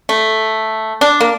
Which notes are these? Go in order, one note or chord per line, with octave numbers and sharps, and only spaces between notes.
A3
D4
A#3